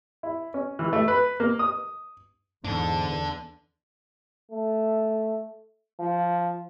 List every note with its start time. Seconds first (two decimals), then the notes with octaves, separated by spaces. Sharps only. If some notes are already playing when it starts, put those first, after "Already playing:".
0.23 E4
0.54 C#4
0.79 E3
0.93 A3
1.08 B4
1.40 A#3
1.59 D#6
2.64 E2 G#2 D4 A4
4.51 A3
6.00 F3